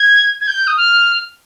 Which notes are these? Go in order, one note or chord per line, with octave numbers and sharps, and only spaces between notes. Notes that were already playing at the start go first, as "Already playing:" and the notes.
Already playing: G#6
G#6
G6
D#6
F6